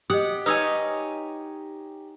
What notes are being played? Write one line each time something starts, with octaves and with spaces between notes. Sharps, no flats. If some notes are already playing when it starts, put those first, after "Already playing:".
G4 D#5 F#5 D#6
D#4 B4 C#5 G#5 D#6 E6